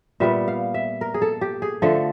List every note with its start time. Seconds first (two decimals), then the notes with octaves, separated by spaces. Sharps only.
0.20 A#2 G3 B3 E5
0.48 F5
0.74 E5
1.01 A#4
1.14 G#4
1.22 A4
1.41 G4
1.62 G#4
1.82 D3 F3 A3 A4